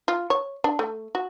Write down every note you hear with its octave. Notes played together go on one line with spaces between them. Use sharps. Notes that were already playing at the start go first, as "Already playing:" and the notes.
F4
C#5
D4
A3
F#4